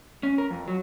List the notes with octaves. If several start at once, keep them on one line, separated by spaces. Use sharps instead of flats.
C#4
A#4
F2
F#3